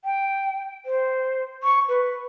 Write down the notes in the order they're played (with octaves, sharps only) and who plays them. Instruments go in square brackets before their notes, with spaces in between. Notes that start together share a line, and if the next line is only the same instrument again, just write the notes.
[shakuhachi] G5
C5
C#6
B4